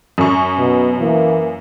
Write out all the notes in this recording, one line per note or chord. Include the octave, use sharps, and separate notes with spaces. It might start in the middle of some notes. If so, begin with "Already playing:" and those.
F#2 C#6
B2
E3 A#3